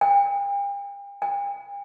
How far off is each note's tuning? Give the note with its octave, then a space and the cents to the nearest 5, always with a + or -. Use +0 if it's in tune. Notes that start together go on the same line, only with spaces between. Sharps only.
G5 +40
G5 +45